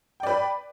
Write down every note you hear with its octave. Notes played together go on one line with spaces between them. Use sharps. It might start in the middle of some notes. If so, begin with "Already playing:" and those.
B4 D5 G5